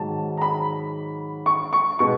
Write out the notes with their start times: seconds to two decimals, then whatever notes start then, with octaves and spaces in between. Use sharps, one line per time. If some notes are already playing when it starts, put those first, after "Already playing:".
Already playing: G#2 D#3 F#3 A5
0.37 A#5
0.41 B5
1.46 C#6
1.73 C#6
1.99 B2 G#3 B3 C#6